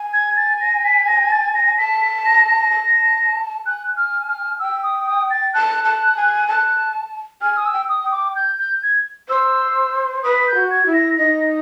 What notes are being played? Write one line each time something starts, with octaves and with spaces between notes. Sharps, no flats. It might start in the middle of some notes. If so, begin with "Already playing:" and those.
Already playing: G#5
G#6
A6
A#6
B6
A#6
A6
A#6
A5 B6
B6
A#6
A#6
A5
G#5 F#6
F6
F6
G5 E6
D#6
D#6
A6
A5 F#6
A5
G#5
A5
G#5 F6
D#6
E6
G5
D#6
G5
D6
G6
G6
G#6
C5 E6
B4 D#6
G6
F#4
G#6
E4
A#6
D#4 A#6